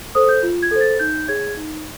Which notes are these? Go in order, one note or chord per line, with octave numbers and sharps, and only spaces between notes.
A4 C5 D#6
G6
F4
G#6
A4 C5
A6
D#4 G6
G#4 C#5 G#6
D#4